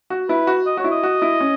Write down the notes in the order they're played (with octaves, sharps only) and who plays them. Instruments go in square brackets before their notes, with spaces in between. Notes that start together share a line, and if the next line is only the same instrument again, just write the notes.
[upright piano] F#4
[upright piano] E4 [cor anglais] B4
[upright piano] F#4
[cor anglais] D#5
[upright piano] F#4 [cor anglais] C#5
[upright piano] E4
[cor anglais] D#5
[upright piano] F#4
E4
C#4